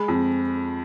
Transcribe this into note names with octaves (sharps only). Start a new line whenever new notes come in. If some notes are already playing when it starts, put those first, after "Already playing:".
Already playing: G#3 B5
F2